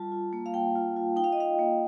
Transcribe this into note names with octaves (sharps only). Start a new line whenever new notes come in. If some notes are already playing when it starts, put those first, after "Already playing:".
Already playing: G3 F4 A5
F4
A#3
F5
A#3 G5
F4
F4
D#4 G5
F5
D#5
D#4 F5
A#3